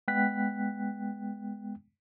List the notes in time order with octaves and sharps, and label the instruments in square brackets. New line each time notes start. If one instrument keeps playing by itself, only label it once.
[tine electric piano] G#3 B3 G5 F#6 B6